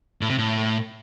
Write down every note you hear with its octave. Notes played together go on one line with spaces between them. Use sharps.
A2
C3
A2